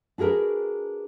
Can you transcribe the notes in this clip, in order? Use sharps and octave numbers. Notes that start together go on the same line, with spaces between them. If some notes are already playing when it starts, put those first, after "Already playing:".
D4 F#4 G#4 A#4 B4